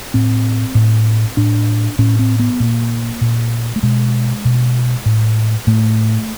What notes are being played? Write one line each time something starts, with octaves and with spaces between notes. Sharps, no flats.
A2 C4
A2
A2 D4
A2 C#4
C4
B3
A#2 A#3
A#2
A3
B2 G#3
B2
A2
A2 A3